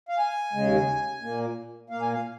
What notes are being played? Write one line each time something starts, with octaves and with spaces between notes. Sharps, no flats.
F5
G#5
D#2 C#3 G#3
A#2 A#3
A#2 A#3 F5
G#5
F5